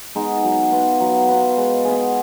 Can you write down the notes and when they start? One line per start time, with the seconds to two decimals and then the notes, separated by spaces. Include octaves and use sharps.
0.15 G#3 B3 D#4
0.44 F#3
0.72 B3 F4 B4
1.00 F#3
1.28 B3 F4 B4
1.57 G#3
1.85 B3 F4 G#4